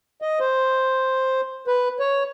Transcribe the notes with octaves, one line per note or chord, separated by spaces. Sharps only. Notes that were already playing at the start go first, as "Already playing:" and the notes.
D#5
C5
B4
C#5